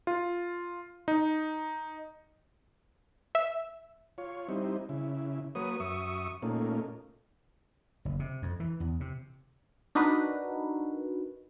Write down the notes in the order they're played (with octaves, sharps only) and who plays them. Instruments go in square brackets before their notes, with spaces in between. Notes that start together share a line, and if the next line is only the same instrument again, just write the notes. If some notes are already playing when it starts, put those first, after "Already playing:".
[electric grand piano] F4
D#4
[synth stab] E5
[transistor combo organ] F4 C#5
G3 C4 D#4 E4
C#3 E4
F#3 A#3 B4 C#5 D#6
F#2 E5 C#6 D#6
A#2 A3 A#3 C#4 D#4 F4
[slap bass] F#1
C3
F2
E3
E2
C3
[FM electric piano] D4 D#4 F#4 A#4 B4